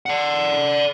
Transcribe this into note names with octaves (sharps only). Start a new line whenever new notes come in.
D5 F#5